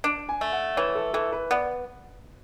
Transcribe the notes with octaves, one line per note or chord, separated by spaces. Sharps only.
D4
G#5
A3
F#5
E3 C#5
A4
E3 A4
B4
B3 D5